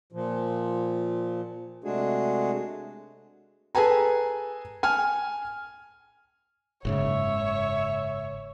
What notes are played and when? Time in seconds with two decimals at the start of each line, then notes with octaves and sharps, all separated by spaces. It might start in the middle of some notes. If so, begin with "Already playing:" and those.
0.12 A#2 F3
1.84 C3 G#3 A3 D4 F#4 G#4
3.75 G#4 A4 B4 G#5 A#5
4.83 G#5 F6
6.85 F#1 G#2 C#3 C#5 E5